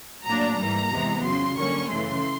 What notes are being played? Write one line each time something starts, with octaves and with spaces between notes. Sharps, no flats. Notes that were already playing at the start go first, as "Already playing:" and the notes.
A2 F#3 A#3 D4 A#5
G#2 E3 G3 A#3 A#5
E2 C3 E3 G#3 B3
F2 C#3 F#3 C6
F#2 D3 G3 A#3 C#4 C#6
C#3 E3 A3 C6